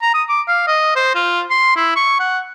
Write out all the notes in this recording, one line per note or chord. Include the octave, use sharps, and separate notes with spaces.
A#5
D#6
D6
F5
D#5
C5
F4
C6
E4
C#6
F#5